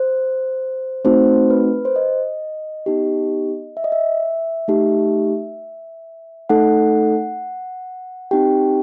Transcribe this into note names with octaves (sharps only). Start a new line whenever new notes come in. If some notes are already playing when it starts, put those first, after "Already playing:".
Already playing: C5
A3 C4 D#4 F#4 C5
B4
C5
D#5
B3 D#4 G4
E5
D#5
E5
A3 D#4 G4
A3 D#4 A4 F#5
C4 D#4 G4 G5